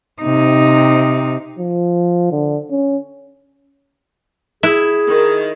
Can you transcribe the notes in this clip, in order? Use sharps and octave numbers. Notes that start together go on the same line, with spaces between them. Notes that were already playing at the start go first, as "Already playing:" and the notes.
C3 D#4
F3
D3
C#4
E4 G#4
D#3